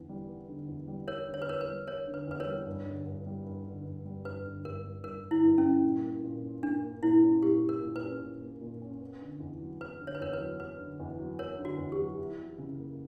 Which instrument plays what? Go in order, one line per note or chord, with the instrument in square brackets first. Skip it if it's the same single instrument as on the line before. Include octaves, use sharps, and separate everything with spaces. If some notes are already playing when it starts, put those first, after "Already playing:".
Already playing: [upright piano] E2 D3 B3
G3
B3
D3
E2
G3
[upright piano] B3 [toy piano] A#4 C#5
[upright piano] D3
[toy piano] C#5
B4
[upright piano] E2 [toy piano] A#4 C#5
[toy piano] B4
[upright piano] G3
[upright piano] B3 [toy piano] A#4 C#5
[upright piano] D3
[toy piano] B4
[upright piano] E2 [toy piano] B4
[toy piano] A#4 C#5
[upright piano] G3
G2
D3
G2
G3
G2
D3
G2
G3
[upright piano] G2 [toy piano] B4
[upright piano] D3
[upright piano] G2 [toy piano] A#4
[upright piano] G3
[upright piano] G2 [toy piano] A#4
[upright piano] D3
[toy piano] E4
[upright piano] G2
[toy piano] C#4
[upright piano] G3
A#2
A#3
A#2
C#4
[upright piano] A#2 [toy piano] D4
[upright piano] A#3
[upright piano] A#2 [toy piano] E4
[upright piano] C#4
[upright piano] A#2 [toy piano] G4
[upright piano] A#3
[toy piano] A#4
[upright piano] A#2
[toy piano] B4
[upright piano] C#4
A#2
A#3
A#2
C#4
B3
D3
E2
F#3
[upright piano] B3 [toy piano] B4
[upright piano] D3
[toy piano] C#5
B4
[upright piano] E2 [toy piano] A#4 C#5
[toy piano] B4
[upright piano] F#3
[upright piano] B3 [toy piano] B4
[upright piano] D3
E2
F#3
[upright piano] B3 [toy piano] A#4 C#5
[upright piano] D3
[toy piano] F#4
[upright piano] E2
[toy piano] G4
[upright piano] F#3
E4
E3
C#3
A#3